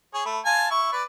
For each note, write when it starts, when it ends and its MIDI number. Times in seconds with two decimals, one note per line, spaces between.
0.14 0.25 68
0.14 0.25 73
0.26 0.40 57
0.26 0.40 83
0.45 0.67 65
0.45 0.67 80
0.45 0.67 81
0.70 0.92 64
0.70 0.92 85
0.92 1.03 71
0.92 1.03 74